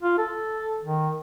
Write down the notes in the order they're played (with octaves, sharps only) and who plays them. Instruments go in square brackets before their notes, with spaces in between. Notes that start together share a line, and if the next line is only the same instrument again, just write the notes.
[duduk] F4
A4
D#3